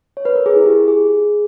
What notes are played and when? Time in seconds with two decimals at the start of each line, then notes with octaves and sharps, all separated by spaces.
0.17 C#5
0.25 B4
0.36 A#4
0.46 G#4
0.56 E4
0.66 G4
0.88 G#4